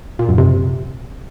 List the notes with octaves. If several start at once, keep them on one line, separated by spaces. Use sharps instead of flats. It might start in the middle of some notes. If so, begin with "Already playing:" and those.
A#2
F#2
C3